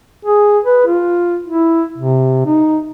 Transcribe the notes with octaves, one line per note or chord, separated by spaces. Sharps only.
G#4
B4
F4
E4
C3
D#4